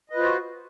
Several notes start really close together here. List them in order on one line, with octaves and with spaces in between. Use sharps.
D#5 B4 F4 C5 F#4